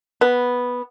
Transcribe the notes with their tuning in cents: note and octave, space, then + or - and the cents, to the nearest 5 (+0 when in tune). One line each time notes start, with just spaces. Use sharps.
B3 -5